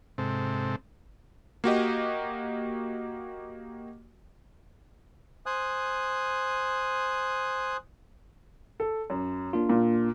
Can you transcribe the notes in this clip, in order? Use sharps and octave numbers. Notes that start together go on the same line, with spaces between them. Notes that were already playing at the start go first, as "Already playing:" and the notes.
G#2 C3 C4 A4
A#3 F#4 G4 D#5
C5 G#5 D#6 F#6
A4
F#2
A#3 D4 F4
A#2